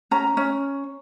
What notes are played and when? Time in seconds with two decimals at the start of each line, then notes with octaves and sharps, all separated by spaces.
0.11 C#4 A#5
0.37 C#4